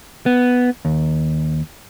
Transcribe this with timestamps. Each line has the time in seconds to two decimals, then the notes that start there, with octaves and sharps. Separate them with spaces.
0.26 B3
0.85 D#2